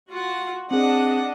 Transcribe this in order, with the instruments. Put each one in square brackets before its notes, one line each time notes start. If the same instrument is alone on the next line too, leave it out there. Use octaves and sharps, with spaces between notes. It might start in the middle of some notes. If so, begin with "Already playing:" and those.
[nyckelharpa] F4 F#5 [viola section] F#4
[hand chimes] C4 G#4 [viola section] D4 D#5 [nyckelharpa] F#5